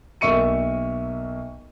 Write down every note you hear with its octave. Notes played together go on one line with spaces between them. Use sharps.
B1 A#3 E5 C#6 C#7 D#7